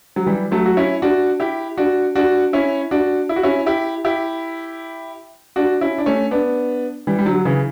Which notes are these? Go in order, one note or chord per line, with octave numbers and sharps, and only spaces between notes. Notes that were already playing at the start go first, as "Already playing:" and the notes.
F#3
E3 G3
F#3 A3
F#4
C#4 E4
D4 F#4
E4 G4
D4 F#4
D4 F#4
C#4 E4
D4 F#4
E4
F#4
C#4 E4
E4 G4
E4 G4
D4 F#4
C#4 E4
D4
A3 C#4
B3 D4
E3 G3
G3
D3 F#3
C#3 E3